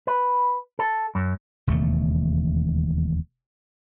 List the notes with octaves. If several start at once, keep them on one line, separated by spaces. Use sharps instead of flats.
B4
A4
F#2
E1 D#2 C#3 A3